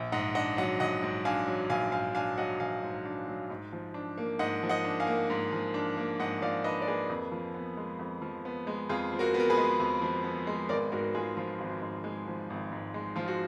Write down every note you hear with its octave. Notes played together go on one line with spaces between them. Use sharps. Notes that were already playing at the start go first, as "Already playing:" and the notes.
Already playing: A#1
G#2 D#5 F#5
D4 D#5 F#5
F#3 D#5 F#5
A#1 D#5 F#5
G#2
D4 F5 G#5
F#3
A#1 F5 G#5
G#2 F5 G#5
D4 F5 G#5
F#3 D#5 F#5
A#1 F5 G#5
G#2
D4
F#3
G#2
F3
D4
A#3
G#2 D#5 F#5
F3
D#5 F#5
D4
F5 G#5
A#3
G#2
F3
D4
A#3
G#2 D#5 F#5
F3 D5 F5
D4 B4 D#5
D5
A#3 G#4 B4
F2
F3
B3
G#3
F2
F3
B3
G#3
F2 F4 G#4
F3
F#4 A#4
B3
A#4
G#4 B4
G#3
F2
F3
B3
G#3
G#1 A#4 D5
G#2 F#4 A#4
G#3 F4 G#4
F3 F4
G#1 F#4
G#2
G#3
F3
G#1
G#2
G#3
F3 F4
F#4